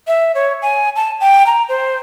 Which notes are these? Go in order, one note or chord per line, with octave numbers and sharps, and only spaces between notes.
E5
C#5
G#5
A5
G5
A#5
C5